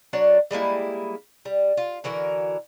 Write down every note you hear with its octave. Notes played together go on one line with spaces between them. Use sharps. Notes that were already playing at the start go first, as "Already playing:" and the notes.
F#3 D4 F#4 C#5
G3 G#3 A#3 E4
G3
F4
D3 E3 F#4 A#4